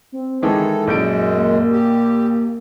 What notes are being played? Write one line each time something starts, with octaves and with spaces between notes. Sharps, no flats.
C4
D#3 E3 G#3 E4 A4
A#1 F#2 G#3 G6 D7
A#3
G4